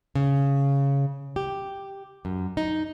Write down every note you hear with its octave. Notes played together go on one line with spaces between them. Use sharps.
C#3
G4
F#2
D#4